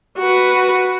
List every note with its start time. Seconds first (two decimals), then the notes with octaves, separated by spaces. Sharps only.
0.19 F#4 B4